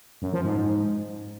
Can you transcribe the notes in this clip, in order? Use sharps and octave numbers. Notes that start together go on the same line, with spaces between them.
F#2
F3
G#2